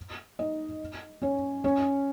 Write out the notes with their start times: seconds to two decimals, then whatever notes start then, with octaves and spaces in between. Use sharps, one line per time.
0.39 D#4 D#5
1.22 C#4 C#5
1.64 C#4 C#5